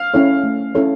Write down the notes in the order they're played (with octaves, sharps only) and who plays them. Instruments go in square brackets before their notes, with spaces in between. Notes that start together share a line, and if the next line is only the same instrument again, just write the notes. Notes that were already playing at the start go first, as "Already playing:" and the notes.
Already playing: [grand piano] F5 F6
[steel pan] C#4 E4 A4 C#5
A3
C#4 E4 A4 C#5